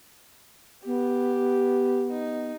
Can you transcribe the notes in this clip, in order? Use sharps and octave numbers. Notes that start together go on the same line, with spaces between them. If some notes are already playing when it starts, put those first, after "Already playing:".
B3 G4
D#4